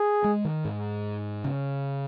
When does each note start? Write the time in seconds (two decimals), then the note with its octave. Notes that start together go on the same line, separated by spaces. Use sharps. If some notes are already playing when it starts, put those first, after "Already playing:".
Already playing: G#4
0.24 G#3
0.45 D#3
0.65 G#2
1.44 C#3